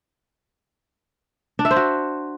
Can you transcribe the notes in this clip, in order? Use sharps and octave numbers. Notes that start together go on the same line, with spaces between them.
D4
E5
C5
F#4